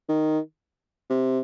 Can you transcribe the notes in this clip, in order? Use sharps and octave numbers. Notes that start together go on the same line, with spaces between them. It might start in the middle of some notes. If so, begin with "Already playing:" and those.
D#3
C3